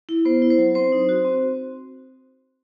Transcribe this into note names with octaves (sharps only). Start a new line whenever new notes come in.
E4
B3 C5
E4
C5
F#3
C4 C5
D#4
F#4
C4